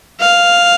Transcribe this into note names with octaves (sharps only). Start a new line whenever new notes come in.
F5